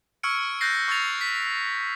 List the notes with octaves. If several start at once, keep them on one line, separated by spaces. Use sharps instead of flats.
C#6 E6 F6 G#6 C#7 D7
F#6 G6 A6 A#6 C7
C#6 E6 G#6 A6 F7
B6